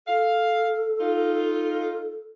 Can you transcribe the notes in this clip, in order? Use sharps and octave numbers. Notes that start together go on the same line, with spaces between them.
A4 F5
D#4 F4